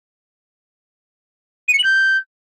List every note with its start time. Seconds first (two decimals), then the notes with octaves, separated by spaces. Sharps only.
1.68 D#7
1.73 C#7
1.78 F#7
1.84 G6